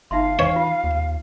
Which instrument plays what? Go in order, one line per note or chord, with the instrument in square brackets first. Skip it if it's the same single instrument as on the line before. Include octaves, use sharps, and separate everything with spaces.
[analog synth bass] G1 [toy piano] D#4 E5 C6 [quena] F5
[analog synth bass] E3 [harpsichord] C#5
[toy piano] F4
[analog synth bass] D#2